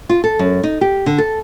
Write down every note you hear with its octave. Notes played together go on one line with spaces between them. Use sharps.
F4
A4
F#2
D#4
G4
D3
A4